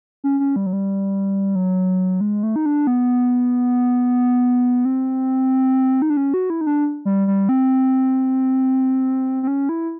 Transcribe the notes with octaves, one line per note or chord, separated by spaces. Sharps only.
C#4
C#4
G3
F#3
G3
F#3
G#3
A3
D#4
D4
B3
C4
D#4
D4
C#4
F#4
E4
D#4
D4
G3
G3
C4
C4
C#4
E4